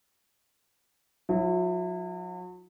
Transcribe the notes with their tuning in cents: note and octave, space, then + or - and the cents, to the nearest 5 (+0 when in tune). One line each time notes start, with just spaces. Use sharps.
F#3 -40 E4 +0